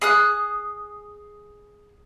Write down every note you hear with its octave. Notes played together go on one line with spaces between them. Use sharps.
G#4 D#6 F#6